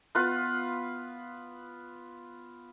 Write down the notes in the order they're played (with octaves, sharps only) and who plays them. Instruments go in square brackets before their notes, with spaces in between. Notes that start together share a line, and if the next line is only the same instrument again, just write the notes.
[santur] B3 F4 B4